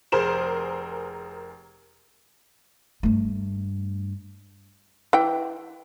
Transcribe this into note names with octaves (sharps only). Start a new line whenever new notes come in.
F1 G#4 A#4 C5 E7
G2 A3
E3 G5